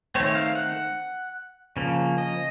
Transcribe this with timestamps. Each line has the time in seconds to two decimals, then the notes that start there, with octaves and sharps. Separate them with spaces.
0.15 D#3 A3 C4 C#5
0.35 F5
0.55 F#5
1.77 C#3 F3 A#3
2.18 D#5